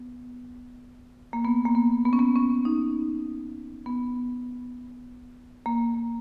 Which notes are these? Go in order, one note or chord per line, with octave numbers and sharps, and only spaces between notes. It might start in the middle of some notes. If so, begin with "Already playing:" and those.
Already playing: B3
A#3
B3
A#3
B3
B3
C#4
B3
C#4
D#4
B3
A#3